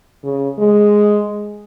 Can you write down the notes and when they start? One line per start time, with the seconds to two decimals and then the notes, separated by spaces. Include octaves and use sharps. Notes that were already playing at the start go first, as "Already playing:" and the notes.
0.23 C#3
0.58 G#3